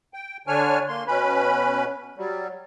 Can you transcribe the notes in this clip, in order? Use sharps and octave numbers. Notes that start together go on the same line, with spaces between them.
G5
D3 D4 C#5 G#5 F6
A#3 C6
B2 C#4 B4 B5
F#3 G3